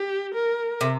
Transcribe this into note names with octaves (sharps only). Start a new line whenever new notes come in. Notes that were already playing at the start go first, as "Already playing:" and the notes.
Already playing: G4
A#4
C3